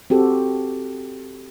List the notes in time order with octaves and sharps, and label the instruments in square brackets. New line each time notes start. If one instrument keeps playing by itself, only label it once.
[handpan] C4 F#4 G4 A4